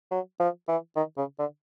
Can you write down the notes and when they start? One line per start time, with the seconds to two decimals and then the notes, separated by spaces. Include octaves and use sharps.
0.11 F#3
0.40 F3
0.68 E3
0.96 D#3
1.17 C#3
1.39 D3